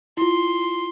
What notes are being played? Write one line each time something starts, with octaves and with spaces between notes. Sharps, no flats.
E4 F4 C6